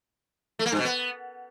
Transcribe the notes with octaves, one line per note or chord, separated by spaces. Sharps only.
A3
A#3
G2
B2
B3